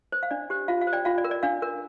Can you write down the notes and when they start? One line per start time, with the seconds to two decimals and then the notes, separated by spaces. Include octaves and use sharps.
0.12 C5
0.23 F5
0.31 D4 D5
0.50 G4 C5
0.68 F4 F5
0.81 F5
0.87 C5
0.93 D5 G5
1.05 F4 F5
1.18 D5
1.24 A#4
1.31 D5
1.43 D4 F5
1.62 A#4